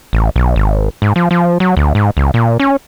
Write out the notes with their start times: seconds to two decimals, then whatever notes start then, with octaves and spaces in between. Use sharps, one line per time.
0.13 A1
0.36 B1
0.56 G#1
1.02 G#2
1.16 F3
1.31 F3
1.60 F#3
1.77 D2
1.95 G#2
2.17 C#2
2.34 A#2
2.60 C#4